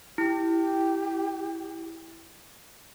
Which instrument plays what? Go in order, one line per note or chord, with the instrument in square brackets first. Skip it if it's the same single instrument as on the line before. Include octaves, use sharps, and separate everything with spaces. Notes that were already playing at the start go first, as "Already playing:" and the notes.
[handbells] E4 [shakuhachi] G4